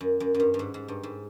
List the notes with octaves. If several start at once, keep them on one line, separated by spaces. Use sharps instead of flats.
F#2
F#2
F#2
G2
G2
G#2
G#2
G2
G#2